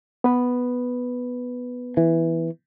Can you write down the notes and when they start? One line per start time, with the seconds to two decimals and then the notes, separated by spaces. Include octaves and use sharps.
0.24 B3 B4
1.97 E3